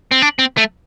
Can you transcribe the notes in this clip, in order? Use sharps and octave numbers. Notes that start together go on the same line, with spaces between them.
C4
D4
C4
A3